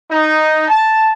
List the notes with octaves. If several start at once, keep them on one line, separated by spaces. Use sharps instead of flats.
D#4
A5